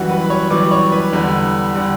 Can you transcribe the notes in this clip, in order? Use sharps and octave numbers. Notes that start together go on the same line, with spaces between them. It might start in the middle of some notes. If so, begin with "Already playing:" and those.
Already playing: F#2 E3 G3 F#4 F#5
B4 B5
B5
C#5 C#6
F#2 E3 G3 D5 D6
C#5 C#6
B4 B5
E2 D3 G3
D3 G3